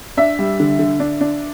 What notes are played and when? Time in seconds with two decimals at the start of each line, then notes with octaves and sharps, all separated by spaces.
0.17 D4 E5
0.39 G3
0.60 D3
0.79 D3
1.00 D4
1.21 D4